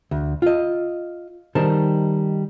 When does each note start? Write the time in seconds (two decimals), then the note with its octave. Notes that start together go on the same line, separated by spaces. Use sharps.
0.11 D2
0.42 F4 D#5
1.55 D#3 G3 D#4 A#4 C5 A5